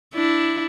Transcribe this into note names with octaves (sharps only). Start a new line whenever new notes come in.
D4 E4